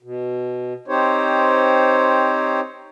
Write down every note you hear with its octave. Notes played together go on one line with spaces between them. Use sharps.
B2
C4 D#4 G4 C5 C#5